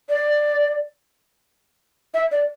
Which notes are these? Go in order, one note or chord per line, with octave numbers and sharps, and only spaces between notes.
D5
E5
D5